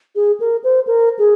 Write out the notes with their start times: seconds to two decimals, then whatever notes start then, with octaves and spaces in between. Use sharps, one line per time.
0.15 G#4
0.40 A#4
0.64 C5
0.87 A#4
1.19 G#4